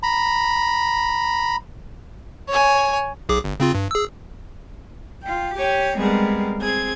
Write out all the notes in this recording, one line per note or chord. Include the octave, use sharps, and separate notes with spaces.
A#5 B5
C#5 G#5
B1 G#4 D6
G1
C#3 C4 F4
G2
G#4 E6
F4 G5
G4 C#5 G5 G#5
G3 G#3 B3 C4 G#4 A#4
C4 G#4 G#6